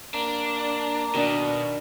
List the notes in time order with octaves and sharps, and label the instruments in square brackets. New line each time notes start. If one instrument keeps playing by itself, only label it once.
[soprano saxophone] A#3 [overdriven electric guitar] D4
[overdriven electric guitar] B2 [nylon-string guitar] D#3 D4